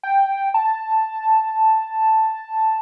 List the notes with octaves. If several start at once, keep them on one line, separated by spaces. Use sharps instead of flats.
G5
A5